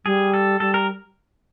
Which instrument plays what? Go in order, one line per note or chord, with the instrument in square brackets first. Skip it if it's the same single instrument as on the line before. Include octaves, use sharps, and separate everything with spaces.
[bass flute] G3 [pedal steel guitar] G#4
[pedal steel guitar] A4
[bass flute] G3 [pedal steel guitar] A4
[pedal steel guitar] A#4